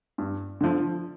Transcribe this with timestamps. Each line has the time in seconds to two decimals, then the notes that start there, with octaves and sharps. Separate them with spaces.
0.18 G2
0.61 D3 F3